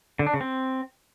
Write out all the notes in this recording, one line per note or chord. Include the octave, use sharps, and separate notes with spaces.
D3
D4
C#3
C4